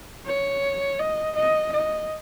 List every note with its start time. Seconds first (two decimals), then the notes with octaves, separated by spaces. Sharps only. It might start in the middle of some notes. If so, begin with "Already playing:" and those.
0.26 C#5
0.99 D#5
1.36 D#5
1.73 D#5